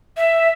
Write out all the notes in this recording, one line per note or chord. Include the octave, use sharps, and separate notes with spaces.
E5